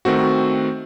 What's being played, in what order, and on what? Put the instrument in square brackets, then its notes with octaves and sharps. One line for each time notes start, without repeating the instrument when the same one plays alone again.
[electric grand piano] D#3 A3 C4 F#4